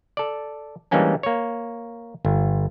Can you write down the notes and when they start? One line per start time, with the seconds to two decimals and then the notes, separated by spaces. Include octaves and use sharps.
0.17 A4 D5
0.91 E3 G3 G#3 A#3 C#4 D4
1.23 A#3 C#5
2.25 G1